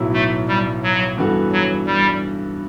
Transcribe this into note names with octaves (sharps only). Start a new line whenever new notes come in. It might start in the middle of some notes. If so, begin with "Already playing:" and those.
Already playing: B1 A2 F#3 B3 E4
A3
G3
F#3
G2 E3 B3 F#4 A4
F#3
G3